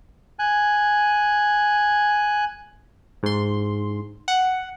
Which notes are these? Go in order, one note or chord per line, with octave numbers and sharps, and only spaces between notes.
G#5 F#6
G#2 C6
F#5